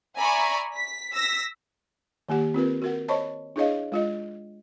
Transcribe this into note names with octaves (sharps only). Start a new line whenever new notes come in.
D5 E5 G#5 A#5 B5 C#6
B6
E6 A#6 B6
D#3 A#3 G4 F#5
C4 F4 A#4 B4
F#4 A#4 F#5
C5 C#5 D#5 A5 B5 C#6
D4 E4 G#4 C#5 D#5 F5
G#3 F4 D#5